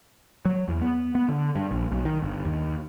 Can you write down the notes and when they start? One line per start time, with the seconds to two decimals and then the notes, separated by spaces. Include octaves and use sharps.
0.45 F#3
0.68 E2
0.82 B3
1.15 B3
1.29 D3
1.56 G2
1.71 A#1
1.92 B1
2.05 D#3
2.22 G1
2.45 D#2